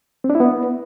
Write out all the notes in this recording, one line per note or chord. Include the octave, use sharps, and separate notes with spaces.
C4
D4
E4
B3